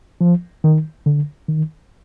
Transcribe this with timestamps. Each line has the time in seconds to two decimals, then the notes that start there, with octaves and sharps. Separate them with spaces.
0.21 F3
0.64 D#3
1.06 D3
1.48 D#3